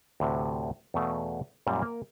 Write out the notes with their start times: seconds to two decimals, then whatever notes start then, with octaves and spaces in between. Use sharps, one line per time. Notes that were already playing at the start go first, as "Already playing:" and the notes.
0.20 D2 A2 C3
0.94 E2 B2 A3 F5
1.67 F#2 A#2 G3
1.82 A#3 A#4